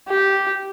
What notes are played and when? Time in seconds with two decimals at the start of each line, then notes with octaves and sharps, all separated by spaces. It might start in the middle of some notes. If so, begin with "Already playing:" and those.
0.08 G4